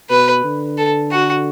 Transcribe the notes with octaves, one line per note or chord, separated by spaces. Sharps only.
B2 B4
D3
A4
F#4